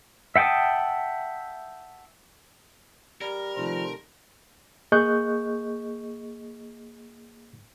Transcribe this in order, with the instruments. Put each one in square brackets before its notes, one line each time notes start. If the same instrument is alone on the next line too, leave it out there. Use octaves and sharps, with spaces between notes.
[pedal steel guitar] E5 F#5 G5 A5 D#6
[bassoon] G3 [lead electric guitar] A#4
[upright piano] C3 D#3 A3 [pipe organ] F3 F4
[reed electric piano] A#3 G#4 D#5 C#6 F#6 G6